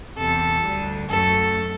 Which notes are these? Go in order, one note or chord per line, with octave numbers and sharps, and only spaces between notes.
E2 C3 E3 A4
D2 D3 G3
F#2 F#3 A3 A4